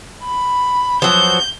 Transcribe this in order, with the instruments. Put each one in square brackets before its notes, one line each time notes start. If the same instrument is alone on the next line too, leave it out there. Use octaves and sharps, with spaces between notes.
[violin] B5
[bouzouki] F3 F#3 B3 [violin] G6